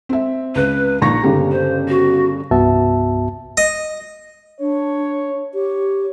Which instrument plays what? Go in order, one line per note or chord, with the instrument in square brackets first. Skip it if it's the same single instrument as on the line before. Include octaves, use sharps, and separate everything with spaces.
[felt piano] C4 E5
[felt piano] C#2 [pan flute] B4
[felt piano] A#1 C#6 A#6 [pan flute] D#4
[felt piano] G1 C#3 G4
[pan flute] C5
F#4
[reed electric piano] C2 G2 B3 F#4 E5 A5
[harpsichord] D#5
[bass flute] D4 [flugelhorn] C#5
[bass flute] G4 [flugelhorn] C#5